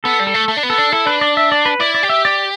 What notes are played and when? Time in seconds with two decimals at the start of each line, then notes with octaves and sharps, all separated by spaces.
0.04 B3 A4
0.20 G3
0.27 A4
0.34 A3
0.48 A3
0.57 D4
0.63 B3
0.70 A4
0.78 D4
0.92 E4 A4
1.06 D4 B4
1.21 D5
1.37 E5
1.52 D5
1.66 B4
1.80 E4 D5
1.94 D5
2.03 G4
2.09 E5
2.25 D5